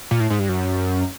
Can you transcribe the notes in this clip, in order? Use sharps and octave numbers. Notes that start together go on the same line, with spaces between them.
A#2
A2
G#2
G2
F#2